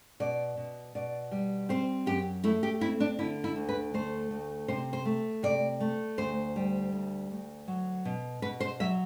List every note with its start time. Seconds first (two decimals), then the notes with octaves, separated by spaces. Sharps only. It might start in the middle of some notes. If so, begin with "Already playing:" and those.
0.20 B2 D5
0.57 B2
0.95 B2 D5
1.31 G3
1.69 C4 C5
2.06 F#2 G4
2.44 A3 E4
2.63 G4
2.81 C4 E4
3.00 D4
3.19 D3 E4
3.44 E4
3.56 D2
3.69 B4
3.94 A3 C5
4.31 D2
4.68 C3 C5
4.93 C5
5.05 A3
5.43 C3 D5
5.80 A3
6.17 D2 C5
6.56 G3
6.92 D2
7.30 D2
7.68 F#3
8.05 B2
8.42 B2 B4
8.60 C5
8.80 F#3 E5